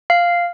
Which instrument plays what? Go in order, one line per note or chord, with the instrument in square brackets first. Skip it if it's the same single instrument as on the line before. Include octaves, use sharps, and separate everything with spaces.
[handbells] F5